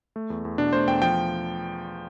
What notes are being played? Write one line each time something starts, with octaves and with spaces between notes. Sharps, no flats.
A3
E2
E2
B2 D4
A3 C5
E2 G5
F3 G5